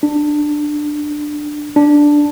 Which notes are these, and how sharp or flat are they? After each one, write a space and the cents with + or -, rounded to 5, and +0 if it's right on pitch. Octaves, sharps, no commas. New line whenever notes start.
D4 +15
D4 +0